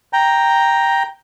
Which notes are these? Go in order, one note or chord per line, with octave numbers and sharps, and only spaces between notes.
G5 A#5